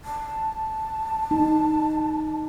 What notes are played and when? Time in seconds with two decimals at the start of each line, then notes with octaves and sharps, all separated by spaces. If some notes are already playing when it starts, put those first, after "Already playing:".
0.05 A5
1.31 D#4